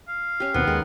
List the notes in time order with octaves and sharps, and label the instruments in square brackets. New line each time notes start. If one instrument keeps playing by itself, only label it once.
[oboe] F5
[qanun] C#4 G4
[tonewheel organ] D#2 B2 C4 [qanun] D#3 [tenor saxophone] B3
[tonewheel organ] D#2 G#3 [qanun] A#4